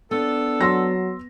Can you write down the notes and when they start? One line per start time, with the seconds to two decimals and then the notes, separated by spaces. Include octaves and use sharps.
0.11 B3 D4 A4
0.61 F#3 C6 E6 A#6